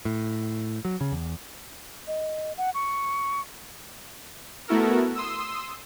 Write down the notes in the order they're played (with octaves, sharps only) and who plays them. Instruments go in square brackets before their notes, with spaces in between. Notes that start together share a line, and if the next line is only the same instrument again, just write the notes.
[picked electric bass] A2
F#3
C#3
E2
[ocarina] D#5
F#5
C#6
[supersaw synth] A3 B3 E4 F#4 A4 A#4
C6 D#6 E6